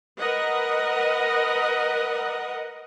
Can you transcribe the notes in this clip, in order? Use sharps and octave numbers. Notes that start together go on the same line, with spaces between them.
A#4 B4 D#5 F#5